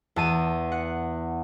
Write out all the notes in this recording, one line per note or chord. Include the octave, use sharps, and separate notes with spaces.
E2 A5 D#7
F#5